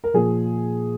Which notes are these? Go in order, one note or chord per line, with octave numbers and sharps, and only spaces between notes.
A#4
A#2 F3 G#4